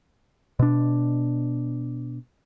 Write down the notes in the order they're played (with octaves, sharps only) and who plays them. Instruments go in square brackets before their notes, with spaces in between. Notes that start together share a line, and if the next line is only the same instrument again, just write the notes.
[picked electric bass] B2 D4